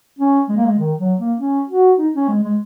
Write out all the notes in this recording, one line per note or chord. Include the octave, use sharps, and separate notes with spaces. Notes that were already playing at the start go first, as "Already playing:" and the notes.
C#4
G#3
A#3
G#3
D#3
F#3
A#3
C#4
F#4
D#4
C#4
G#3
G#3